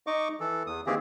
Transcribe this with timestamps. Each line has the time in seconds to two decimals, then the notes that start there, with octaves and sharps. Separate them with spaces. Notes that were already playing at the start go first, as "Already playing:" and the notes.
0.07 D#4 D#5 C#6 D6
0.40 E3 A4
0.67 E2 D#6
0.87 D#3 E3 A#3 C4 G4 G#4